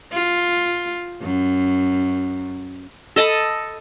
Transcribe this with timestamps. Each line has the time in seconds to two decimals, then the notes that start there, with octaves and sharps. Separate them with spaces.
0.12 F4
1.21 F#2
3.16 A4 D#5 A5 B5